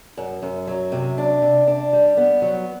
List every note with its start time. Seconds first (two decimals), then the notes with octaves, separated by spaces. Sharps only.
0.17 F#2
0.42 F#2
0.67 F#3
0.92 C3
1.18 D4
1.42 C3
1.67 D4
1.93 G3
2.17 B3
2.42 F#3